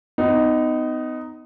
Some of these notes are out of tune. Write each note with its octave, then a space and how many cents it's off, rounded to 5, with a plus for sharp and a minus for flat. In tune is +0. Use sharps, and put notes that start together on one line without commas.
B3 +35 D#4 +0